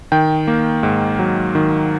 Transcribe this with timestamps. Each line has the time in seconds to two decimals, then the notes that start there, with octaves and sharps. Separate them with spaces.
0.12 D#3 G5
0.48 A#3
0.83 G#2
1.19 F#3
1.55 D#3